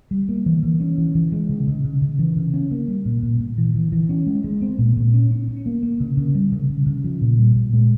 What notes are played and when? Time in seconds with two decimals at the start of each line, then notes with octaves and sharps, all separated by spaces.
0.11 G3
0.29 A#3
0.46 E3
0.63 E3
0.80 C#4
0.98 E3
1.15 E3
1.32 G#3
1.49 C#3
1.67 C#3
1.84 C#3
2.02 C#3
2.19 E3
2.36 C#3
2.54 C#4
2.71 A#3
2.88 G3
3.05 A#2
3.23 A#2
3.40 A#2
3.58 E3
3.75 E3
3.92 E3
4.09 C#4
4.27 G#3
4.44 G#3
4.62 C4
4.78 A#2
4.97 A#2
5.14 C#4
5.31 C#4
5.48 C#4
5.66 A#3
5.83 A#3
6.00 C#3
6.17 C#3
6.35 G3
6.52 C#3
6.70 C#3
6.86 C#3
7.04 F3
7.21 A#2
7.39 G3
7.56 A#2
7.73 G#3